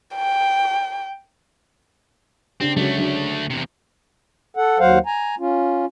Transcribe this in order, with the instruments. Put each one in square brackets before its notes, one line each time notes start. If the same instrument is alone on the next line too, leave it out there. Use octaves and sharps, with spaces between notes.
[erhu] G5
[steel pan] C#3 D4 G4 [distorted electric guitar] C4
[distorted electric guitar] D2 A3 [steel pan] C#3 F#3 G#3
[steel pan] F#3 D4
[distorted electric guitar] E2 C3
[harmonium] A4 F#5
D#2 F#3 C5 F5 F#5
G#5 A#5
C#4 F4